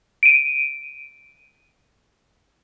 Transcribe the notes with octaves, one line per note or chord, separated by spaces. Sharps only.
D7 D#7